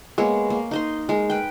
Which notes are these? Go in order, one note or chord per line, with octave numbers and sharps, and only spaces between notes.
G#3 A#3 B3 C#5
A#3
D#4 D#5 C6
G#3 A#4
B4 G5